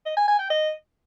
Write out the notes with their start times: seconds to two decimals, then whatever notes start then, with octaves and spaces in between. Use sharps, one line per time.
0.06 D#5
0.17 G#5
0.28 G#5
0.39 G5
0.50 D#5